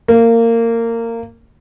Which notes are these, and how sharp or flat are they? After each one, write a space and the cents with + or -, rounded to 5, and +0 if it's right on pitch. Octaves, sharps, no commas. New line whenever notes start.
A#3 -20